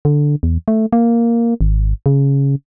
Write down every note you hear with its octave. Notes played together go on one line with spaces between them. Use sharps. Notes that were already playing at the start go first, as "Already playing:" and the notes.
D3
E2
A3
A#3
G#1
C#3